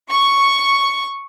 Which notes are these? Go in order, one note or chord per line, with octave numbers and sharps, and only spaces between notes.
C#6